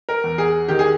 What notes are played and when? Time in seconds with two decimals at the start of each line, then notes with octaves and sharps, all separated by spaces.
0.09 A#4
0.24 E2
0.38 G#4
0.68 D#3 G4
0.79 G#4